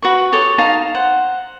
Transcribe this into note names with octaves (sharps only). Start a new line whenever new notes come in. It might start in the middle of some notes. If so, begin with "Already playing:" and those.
F#4 B4 C#6
G4 A4 C#5 D#6
D#4 F5 A5 A#5
C5 F#5